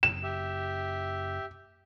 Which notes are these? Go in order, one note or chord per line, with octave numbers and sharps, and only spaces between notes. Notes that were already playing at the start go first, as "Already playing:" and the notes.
F#1 F#2 E7
G4 E5